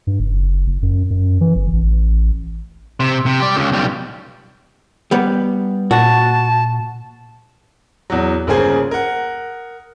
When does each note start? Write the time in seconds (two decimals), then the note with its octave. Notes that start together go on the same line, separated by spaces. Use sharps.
0.07 G2
0.20 F#1
0.67 F#1
0.83 F#2
1.10 F#2
1.41 E3
1.56 G1
1.73 A1
3.00 C3
3.26 C3
3.40 G4 D5
3.56 C#2 C#3
3.72 B1 G3
5.11 G3 B3
5.91 A#2 F#4 A5
8.10 E2 F#3
8.47 G1 C#3 A#3 G#4 C5 G#5
8.91 A#4 F#5